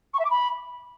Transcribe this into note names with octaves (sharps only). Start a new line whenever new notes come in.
C#6
E5
D6
B5